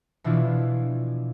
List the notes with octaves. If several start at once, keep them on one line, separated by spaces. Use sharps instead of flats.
B2 E3 F3 D4 E4 F4